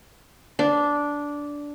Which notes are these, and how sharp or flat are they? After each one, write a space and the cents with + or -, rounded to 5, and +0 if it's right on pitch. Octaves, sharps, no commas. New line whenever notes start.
D4 -10